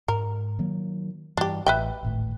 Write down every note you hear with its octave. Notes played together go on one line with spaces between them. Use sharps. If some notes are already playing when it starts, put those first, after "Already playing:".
G#2 A#4
D#3 F#3 A#3
G2 E3 D4 G4
A1 B4 E5 G5
D1 G#1 A2